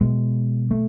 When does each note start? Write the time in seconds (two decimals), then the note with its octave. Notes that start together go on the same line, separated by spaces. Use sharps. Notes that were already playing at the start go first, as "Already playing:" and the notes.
0.01 B2 G#3
0.71 A3